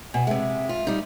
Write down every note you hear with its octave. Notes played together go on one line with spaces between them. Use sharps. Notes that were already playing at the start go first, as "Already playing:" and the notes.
B2 G#5
C3 G#3 E5
F4
G3 D#4